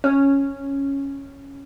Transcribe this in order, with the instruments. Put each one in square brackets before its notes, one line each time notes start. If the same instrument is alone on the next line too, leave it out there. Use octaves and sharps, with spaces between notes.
[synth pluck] C#4